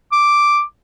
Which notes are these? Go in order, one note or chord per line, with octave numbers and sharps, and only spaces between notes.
D6